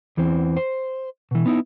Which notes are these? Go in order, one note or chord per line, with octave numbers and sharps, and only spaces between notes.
E2 E3 C4
C5
B2 E3
B3 D#4 E4